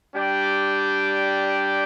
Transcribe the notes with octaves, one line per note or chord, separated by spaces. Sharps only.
G3 D4 G4 D5 G5